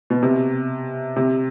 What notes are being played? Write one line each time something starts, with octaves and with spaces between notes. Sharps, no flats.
B2
C3
C3